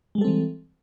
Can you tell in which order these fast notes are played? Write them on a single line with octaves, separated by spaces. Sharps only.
G#3 G3 A4 C4 E3